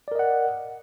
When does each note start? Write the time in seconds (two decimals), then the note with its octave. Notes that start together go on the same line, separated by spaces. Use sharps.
0.08 D5
0.12 A#4
0.15 D#5
0.19 F#5